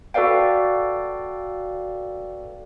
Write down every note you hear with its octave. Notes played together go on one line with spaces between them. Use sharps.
F#4 A4 B4 D5 F5 G5